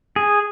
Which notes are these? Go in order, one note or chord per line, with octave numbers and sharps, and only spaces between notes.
G#4